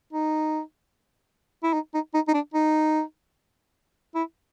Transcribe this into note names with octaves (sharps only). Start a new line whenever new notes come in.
D#4
E4
D#4
D#4
D#4
D#4
D4
D#4
E4